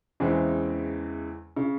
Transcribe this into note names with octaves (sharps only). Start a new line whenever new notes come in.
E2 C#3 E3 G#3 C4
C#3